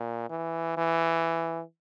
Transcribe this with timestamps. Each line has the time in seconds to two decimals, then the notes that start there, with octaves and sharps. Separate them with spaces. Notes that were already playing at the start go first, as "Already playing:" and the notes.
Already playing: A#2
0.30 E3
0.77 E3